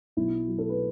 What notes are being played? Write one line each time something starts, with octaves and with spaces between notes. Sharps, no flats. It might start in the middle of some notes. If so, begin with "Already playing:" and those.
B1 E4
F#3
A4
B4